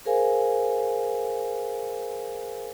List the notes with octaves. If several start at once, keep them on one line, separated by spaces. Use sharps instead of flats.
G#4 A#4 C5 F5 G#5